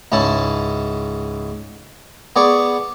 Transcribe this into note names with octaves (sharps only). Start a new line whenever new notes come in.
C#2 G#2 C#4 E4 A5
B3 G#4 D5 C#6